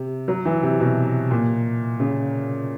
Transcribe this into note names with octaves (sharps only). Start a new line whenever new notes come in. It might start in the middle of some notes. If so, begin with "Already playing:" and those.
Already playing: C3
F#3
E3
C3
B2
A#2
C#3